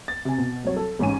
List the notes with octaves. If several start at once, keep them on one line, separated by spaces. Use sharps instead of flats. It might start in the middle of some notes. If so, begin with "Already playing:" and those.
A6
C3 G#5
B2
C2 F#3 C#5
A4
A1 G#2 C#4 G#5 D#7